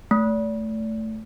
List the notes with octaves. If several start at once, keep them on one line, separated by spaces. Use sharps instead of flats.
A3